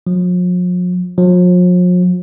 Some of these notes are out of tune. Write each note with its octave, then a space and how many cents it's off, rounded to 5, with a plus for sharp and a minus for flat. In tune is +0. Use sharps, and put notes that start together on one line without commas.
F3 +45
F3 +45